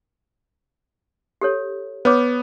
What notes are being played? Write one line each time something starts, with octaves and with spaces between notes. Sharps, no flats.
G4 A4 C#5
B3 B4 C#5 D6